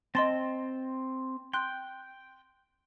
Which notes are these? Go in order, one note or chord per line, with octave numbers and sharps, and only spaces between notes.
C4 D#5 A5 C6 A6
G5 C6 F#6